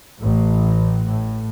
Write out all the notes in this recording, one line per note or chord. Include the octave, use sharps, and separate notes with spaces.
A1 A2
A2